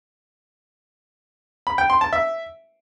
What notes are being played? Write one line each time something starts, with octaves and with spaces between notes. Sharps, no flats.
B5
G5
C6
A5
E5